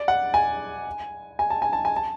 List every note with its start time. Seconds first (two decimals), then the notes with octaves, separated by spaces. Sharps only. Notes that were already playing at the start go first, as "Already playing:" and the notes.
Already playing: D5
0.08 F#5
0.34 G#5
1.39 G#5
1.50 A5
1.62 G#5
1.73 A5
1.85 G#5
1.96 A5